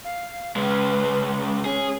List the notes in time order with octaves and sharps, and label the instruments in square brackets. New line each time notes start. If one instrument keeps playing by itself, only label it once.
[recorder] F5
[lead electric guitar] C#2 G#3 [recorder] B4
[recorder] C#4 [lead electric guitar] G#4